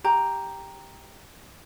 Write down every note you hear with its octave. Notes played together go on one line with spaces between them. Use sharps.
G4 A#5